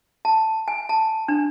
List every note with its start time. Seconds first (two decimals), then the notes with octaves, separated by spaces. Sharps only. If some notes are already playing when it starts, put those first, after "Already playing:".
0.25 A5
0.68 G#5
0.89 A5
1.28 D4